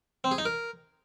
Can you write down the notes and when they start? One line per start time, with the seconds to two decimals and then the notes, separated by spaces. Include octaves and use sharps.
0.24 C4
0.31 G#4
0.38 D#4
0.45 A#4